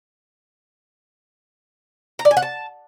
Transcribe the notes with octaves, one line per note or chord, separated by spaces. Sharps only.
A#5
D5
G#5
F#5
A5